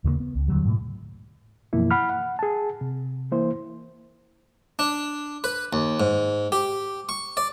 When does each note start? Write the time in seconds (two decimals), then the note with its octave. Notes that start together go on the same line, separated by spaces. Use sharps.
0.04 D#2 C#3 G3 A#3
0.20 B3
0.35 C#2
0.48 D#2 D3 F#3 G3
0.65 G#2 B2 A3
1.73 F#2 B2 E3 F3 A#3 E4
1.91 F#5 B5 F6
2.10 F#5
2.39 G#4 A5
2.81 C3
3.32 E3 A#3 E4 C5
4.79 D4
5.44 B4
5.73 D#2
6.00 G#2
6.52 G4
7.09 C#6
7.37 D5